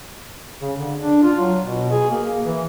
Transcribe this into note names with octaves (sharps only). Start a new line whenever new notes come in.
C#3
D3
D4
F4
F#3
B2
G#4
A#3
E3